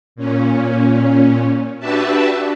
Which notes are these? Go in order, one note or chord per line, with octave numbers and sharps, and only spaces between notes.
A#2 C#4
D4 F#4 G4 B4 E5 A5